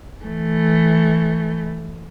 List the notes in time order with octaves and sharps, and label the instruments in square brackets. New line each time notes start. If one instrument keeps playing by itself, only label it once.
[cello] E3 A3